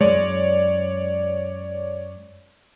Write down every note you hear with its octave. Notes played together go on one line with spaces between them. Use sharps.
F#2 G#3 C#5 D5